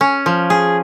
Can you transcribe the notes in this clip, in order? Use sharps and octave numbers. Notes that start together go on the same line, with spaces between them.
C#4
F3
G#4